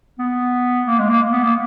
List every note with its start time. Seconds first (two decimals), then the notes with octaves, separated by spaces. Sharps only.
0.19 B3
0.87 A#3
0.99 G#3
1.09 A#3
1.32 B3
1.43 A#3